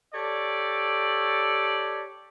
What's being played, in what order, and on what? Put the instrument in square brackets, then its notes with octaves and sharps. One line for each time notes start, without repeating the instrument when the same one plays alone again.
[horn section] G4 A4 C#5 D5